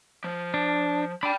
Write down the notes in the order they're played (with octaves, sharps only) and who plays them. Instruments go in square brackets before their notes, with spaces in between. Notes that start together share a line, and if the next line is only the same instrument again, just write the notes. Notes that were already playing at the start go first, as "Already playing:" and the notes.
[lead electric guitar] F3
[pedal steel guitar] D4
[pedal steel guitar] D4 [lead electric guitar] G5 B5